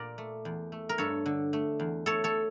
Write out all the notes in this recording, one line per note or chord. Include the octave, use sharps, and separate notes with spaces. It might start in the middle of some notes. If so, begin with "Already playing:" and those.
Already playing: A#2 A#4 D5
A3
E2
A3
A#4
G2 A4 C#5
D3
A3
E2
A3 A4 C#5
A4 C#5